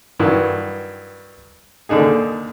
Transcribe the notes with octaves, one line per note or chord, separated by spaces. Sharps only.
G2 D#3 E3 F#3
D#2 D3 D4 D#4 G#4